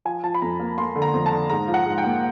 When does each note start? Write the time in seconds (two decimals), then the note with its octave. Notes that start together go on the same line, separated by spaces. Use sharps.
0.05 F3 G#5
0.24 F3 A5
0.34 B5
0.42 F2 A#5
0.59 A#3
0.78 A#3 C6
0.96 D3
1.02 A#5
1.14 F2
1.26 A5
1.31 D3
1.50 G#2 A#5
1.68 F3
1.74 F#5
1.86 G#2
1.98 G5
2.04 A#3